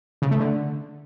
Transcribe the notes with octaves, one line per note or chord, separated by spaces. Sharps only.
C#3
A3
D3